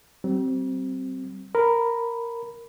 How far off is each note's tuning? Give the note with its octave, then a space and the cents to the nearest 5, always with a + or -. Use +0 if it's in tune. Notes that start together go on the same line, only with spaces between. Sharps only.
G3 -40 C4 +0
A#4 +0 B5 +5